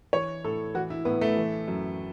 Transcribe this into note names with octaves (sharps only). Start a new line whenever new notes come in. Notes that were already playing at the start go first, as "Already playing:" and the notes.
E3 C#5
A2 A4
E3 F#4
E4
A2 B3
A3
E3
F#2